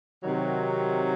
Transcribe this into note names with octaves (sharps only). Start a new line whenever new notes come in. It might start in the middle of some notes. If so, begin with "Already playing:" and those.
C3 D#3 F#3